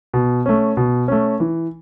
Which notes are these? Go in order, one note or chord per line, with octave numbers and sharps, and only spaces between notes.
B2
A3 C#4
B2
A3 C#4
E3